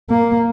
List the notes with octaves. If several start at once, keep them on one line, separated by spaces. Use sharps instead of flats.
A#3